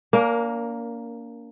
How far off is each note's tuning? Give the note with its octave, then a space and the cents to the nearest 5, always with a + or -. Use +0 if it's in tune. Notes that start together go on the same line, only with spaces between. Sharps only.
A#3 +0 D4 -40 A#4 +15